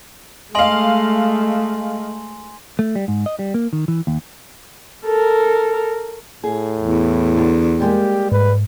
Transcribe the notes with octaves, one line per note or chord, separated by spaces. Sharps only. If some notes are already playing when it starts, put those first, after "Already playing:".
G#3 A3 D#5 F5 G#5 C6 F#7
A3
G3
G#2
D#5
G3
A#3
D#3
E3
D#2
A4 A#4
A2 G#4
E2
D2 D3
G3 G#3 A#3 G4
G#2 B4